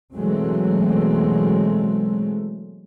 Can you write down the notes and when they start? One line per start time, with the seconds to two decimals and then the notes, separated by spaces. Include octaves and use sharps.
0.15 B2 E3 F#3 G#3 A3 C4